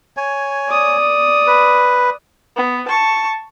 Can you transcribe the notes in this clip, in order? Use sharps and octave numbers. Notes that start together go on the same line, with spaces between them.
C#5 G#5
D5 D#6
B4
B3
A5 C#6